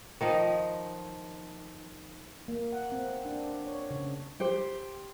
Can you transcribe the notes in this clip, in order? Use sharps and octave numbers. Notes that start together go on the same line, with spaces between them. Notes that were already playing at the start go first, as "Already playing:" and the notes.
D#3 F3 D#4
A#3
F#5
C4
D4
C#5
C#3
G4 C5